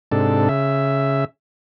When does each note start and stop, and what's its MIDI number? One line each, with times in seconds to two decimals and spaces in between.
0.12 0.48 44
0.12 0.48 48
0.12 0.48 62
0.12 0.48 69
0.49 1.25 49
0.49 1.25 76